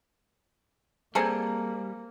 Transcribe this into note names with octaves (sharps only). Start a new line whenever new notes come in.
G3 A#3 C4 G#4 A4 A#5 G#6